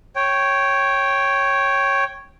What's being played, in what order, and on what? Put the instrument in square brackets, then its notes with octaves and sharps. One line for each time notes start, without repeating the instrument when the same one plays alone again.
[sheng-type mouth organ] C#5 G5